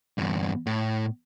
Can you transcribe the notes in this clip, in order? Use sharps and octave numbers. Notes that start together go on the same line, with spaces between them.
E2 G2
A2